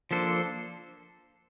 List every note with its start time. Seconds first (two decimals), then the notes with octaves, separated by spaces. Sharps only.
0.11 F3 A#3 D4 A4 C5